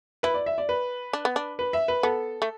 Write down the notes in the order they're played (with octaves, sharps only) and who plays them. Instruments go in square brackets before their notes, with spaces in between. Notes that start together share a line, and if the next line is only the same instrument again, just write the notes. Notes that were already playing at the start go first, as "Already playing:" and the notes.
[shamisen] E4 [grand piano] B4
[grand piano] D5
E5
D5
B4
[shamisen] D4
B3
D4
[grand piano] B4
E5
B4
[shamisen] B3 [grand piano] A4
[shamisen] A3